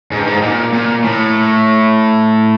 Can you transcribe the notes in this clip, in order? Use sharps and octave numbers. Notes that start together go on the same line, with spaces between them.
G#2
G2
G#2
A#2
A#2
A2